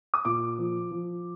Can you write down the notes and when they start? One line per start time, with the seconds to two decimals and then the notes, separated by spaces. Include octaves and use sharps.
0.14 D#6
0.25 A#2 D6
0.58 F3
0.91 F3